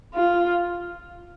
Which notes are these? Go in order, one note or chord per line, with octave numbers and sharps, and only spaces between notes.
F4